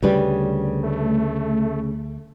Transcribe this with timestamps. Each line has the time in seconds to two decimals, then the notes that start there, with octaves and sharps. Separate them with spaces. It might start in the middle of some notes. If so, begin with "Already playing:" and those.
0.03 D2 C#3 G3 B4
0.83 A3